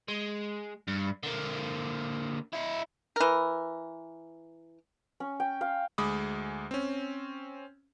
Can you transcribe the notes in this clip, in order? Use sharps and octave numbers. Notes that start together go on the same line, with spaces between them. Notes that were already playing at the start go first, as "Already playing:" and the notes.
G#3
G2
D3 A#3
E4 D#5
E3 A#4
C#4
G5
F5 C6
D2 G#3 B5 D6 D#6
C4 C#4